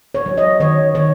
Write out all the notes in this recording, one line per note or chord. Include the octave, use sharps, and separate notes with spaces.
C#5
F#3
D#5
D#3 C#5
D#3 C#5